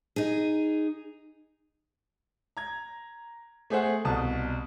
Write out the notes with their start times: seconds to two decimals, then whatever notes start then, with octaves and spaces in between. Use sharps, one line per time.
0.16 D#4 G#4
2.57 A#5 G#6
3.70 A3 G#4 C5 F#5
4.05 C2 B2 A5 D#6